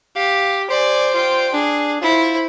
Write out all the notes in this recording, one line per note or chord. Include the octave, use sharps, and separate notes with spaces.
G4 F5
C5 D5 G#5
F4 G5
D4 G#4
E4 F4 C5